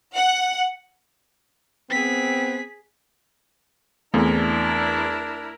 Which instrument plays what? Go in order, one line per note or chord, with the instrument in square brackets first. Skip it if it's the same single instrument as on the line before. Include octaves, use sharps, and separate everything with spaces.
[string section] F#5
[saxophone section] B3 C4 [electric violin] G#4 B6
[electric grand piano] E2 [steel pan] A3 C4 G#4 [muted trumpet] D4 [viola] E4 A#4